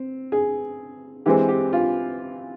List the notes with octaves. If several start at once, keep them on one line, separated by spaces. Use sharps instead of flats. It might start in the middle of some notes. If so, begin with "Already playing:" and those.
Already playing: C4
G#4
E3 G#3 C4 G4
G4
F4